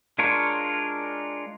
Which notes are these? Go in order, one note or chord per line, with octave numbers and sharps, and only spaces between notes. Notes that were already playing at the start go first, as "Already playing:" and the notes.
G#3 D4 F4 A#4 C#5